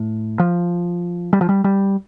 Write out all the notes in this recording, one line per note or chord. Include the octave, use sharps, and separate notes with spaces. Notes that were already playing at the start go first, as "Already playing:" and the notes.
Already playing: A2
F3
G3
F3
G3
G3